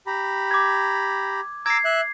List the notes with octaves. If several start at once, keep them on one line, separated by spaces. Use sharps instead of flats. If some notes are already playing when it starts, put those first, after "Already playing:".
G4 A#5 B5
D6 G#6
A#5 D6 E6 G#6 C7
E5 F#6